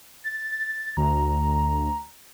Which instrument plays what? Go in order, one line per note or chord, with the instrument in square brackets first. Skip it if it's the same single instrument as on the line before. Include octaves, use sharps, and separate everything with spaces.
[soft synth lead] A6
[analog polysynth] D2 [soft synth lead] A#5